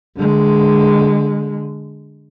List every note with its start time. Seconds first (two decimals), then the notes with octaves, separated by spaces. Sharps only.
0.17 D3 G#3